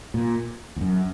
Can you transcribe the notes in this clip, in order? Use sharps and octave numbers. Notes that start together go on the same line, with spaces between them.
A#2
E2
F#2